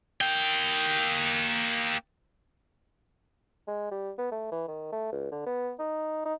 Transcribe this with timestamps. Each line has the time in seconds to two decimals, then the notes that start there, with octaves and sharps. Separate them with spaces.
0.21 A#3 G5
3.68 G#3
3.91 G3
4.18 B3
4.32 A3
4.52 E3
4.68 D#3
4.93 A3
5.13 C#2
5.32 D3
5.46 B3
5.79 D#4
6.26 D#4